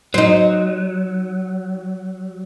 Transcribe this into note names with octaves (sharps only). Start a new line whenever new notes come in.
F#3 D#4 C5